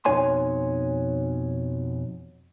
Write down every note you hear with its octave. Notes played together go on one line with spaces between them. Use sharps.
F2 B2 D#4 C#5 G#5 C6